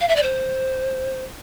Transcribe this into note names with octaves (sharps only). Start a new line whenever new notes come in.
F5
E5
D5
C5